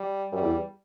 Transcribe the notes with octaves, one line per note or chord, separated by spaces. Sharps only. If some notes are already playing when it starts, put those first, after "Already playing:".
Already playing: G3
F#2 G3
E2